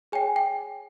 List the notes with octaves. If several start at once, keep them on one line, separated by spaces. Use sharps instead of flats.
G#4 C#5 G5 G#5
G5